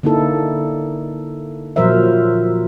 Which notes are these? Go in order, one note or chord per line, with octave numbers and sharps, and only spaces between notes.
D3 A#3 D#4 E4 A4
A#2 F3 F#3 A#4 C5 E5